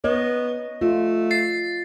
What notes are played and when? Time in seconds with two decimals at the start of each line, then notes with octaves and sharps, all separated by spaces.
0.04 B3 C#5 D#5
0.81 A3 F4
1.31 A6 C7